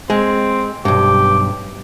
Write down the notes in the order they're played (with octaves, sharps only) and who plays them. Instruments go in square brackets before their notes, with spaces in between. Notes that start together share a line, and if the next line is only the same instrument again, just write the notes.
[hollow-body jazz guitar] G#3 [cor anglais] C4
[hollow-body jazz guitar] B1 G2 [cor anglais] G4